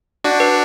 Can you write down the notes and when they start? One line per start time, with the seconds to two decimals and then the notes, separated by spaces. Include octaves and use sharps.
0.24 D4 F#4 D5
0.40 B4